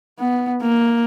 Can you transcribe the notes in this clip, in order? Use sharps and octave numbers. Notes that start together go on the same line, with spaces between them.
B3
A#3